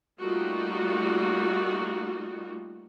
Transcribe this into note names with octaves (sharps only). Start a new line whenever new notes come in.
G3 A3 A#3 D#4 F4 F#4